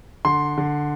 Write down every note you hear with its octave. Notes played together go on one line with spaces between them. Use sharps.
D3 C6
D3